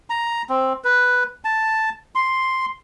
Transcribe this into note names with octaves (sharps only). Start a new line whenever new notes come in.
A#5
C4
B4
A5
C6